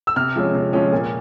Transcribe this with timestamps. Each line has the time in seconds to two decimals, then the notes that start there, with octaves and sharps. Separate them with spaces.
0.07 E6
0.16 C3 F6
0.36 F3 G#3 C#4
0.55 C3
0.73 F3 G#3 C#4
0.92 A#2